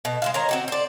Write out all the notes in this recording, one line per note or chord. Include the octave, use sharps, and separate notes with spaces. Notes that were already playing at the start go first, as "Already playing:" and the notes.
B2
G#3 C5 F5
D#3 C5 C#5 A#5
C4 F#4 G4
C5 D5